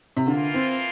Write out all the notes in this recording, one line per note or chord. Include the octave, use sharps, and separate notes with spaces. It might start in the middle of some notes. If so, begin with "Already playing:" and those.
C3
D3 E3 A#3 F4
C4